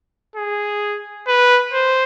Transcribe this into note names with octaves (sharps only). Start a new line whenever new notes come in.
G#4
B4
C5